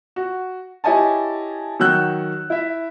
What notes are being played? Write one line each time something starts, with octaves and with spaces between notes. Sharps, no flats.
F#4
E4 G4 C#5 D#5 G#5 A5
D#3 F#3 F#4 E6 F#6 G6
E4 E5